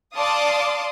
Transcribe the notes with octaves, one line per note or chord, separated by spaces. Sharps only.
D5 F5 A5 C6 D6 D#6